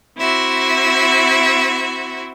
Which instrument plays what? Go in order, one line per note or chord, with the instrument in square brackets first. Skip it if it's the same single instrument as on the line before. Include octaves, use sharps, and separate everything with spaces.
[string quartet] C4 E4 F#4 E5